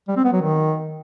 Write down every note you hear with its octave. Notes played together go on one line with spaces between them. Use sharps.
G3
C4
B3
F#3
D#3